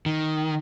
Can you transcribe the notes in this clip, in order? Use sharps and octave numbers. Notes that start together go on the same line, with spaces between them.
D#3